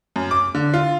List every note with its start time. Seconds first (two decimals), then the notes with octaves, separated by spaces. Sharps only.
0.16 F#2
0.31 D6
0.55 D3
0.74 F4